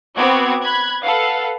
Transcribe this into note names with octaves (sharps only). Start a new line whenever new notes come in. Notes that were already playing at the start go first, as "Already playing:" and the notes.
B3 C4 F#4 D6 G#6
B5 F#6 G#6
A4 B4 F5 F#5